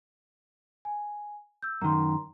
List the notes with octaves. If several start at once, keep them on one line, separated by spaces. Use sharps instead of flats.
G#5
E6 G6
F#2 D#3 A#5 C6